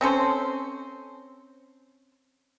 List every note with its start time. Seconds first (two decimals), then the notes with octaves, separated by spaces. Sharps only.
0.01 C4 C#4 A4 C5